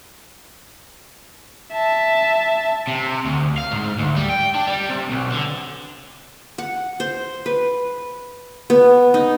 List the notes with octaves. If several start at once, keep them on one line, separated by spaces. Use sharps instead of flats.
E5 A5
C3
D2
F5
G#2
D2
G3
G5
D4
G3
C3
B1
D3
F#5
C5
B4
B3
D#4